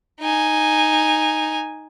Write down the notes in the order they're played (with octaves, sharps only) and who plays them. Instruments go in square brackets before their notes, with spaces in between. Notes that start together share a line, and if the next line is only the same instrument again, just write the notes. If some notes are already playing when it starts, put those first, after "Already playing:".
[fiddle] D#4 G#5